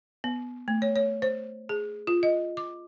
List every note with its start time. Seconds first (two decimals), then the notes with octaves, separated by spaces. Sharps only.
0.24 B3
0.68 A3
0.82 C#5
0.96 C#5
1.22 C5
1.69 G#4
2.07 F4
2.23 D#5
2.57 D6